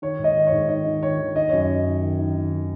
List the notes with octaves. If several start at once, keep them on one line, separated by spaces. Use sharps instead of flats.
D#3 C#5
G#2
D#5
D#3
C#5
G#2
D#3 D#5
D#3
D#3 C#5
D#3
D#3 D#5
F#2 C#5
D#5
D#3
D#3
D#3
D#3
D#3
D#3